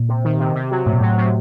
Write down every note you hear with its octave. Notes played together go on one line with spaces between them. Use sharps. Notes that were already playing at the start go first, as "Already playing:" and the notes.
Already playing: A#2
C3
D#3
C3
C3
F#3
A2 C3
A#2
A2 F#3
C3